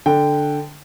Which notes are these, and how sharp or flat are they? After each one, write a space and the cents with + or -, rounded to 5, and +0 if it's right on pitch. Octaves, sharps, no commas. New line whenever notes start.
D3 +0 G5 +0